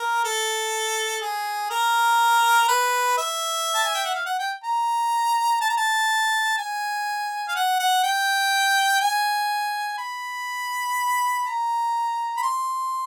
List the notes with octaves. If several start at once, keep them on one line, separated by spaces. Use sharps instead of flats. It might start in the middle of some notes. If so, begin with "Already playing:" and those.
Already playing: A#4
A4
G#4
A#4
B4
E5
A5
G#5
G5
F#5
F5
F#5
G5
A#5
A5
A#5
A5
G#5
F5
F#5
F#5
G5
G#5
B5
A#5
B5
C6